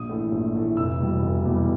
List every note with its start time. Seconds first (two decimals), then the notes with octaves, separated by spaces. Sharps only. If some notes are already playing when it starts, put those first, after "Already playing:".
Already playing: A#1 D#6
0.09 A2 E3 A3
0.32 A#1
0.55 A2 E3 A3
0.77 F1 E6
1.00 E2 B2 G3
1.22 F1
1.45 E2 B2 G3